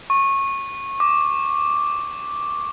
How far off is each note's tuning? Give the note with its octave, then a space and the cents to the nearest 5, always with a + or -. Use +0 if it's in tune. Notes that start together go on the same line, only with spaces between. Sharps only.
C#6 -20
D6 -5